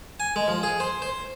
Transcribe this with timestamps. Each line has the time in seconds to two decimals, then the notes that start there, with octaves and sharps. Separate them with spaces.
0.20 G#5
0.36 G#3
0.48 F3
0.63 G#4
0.80 C5
1.02 C5